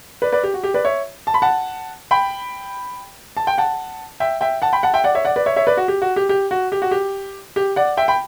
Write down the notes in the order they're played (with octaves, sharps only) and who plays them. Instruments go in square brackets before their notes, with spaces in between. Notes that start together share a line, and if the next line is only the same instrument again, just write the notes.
[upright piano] B4 D5
B4 D5
G4
F#4
G4
B4 D5
C#5 E5
A5
B5
F#5 A5
G5 B5
A5
G5
F#5 A5
E5 G5
E5 G5
F#5 A5
G5 B5
F#5 A5
E5 G5
D5 F#5
C#5 E5
D5 F#5
B4 D5
C#5 E5
C#5 E5
B4 D5
F#4
G4
F#4
G4
G4
F#4
G4
F#4
G4
G4
D5 F#5
E5 G5
G5 B5